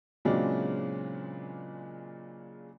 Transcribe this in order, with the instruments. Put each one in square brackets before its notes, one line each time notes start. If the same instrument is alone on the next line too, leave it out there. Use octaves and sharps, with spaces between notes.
[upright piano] A#2 C#3 F#3 G#3 C4 D4